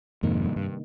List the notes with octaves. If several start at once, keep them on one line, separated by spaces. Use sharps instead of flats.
F2 G#2 C3 D#3 A#3 D#4
G2
G2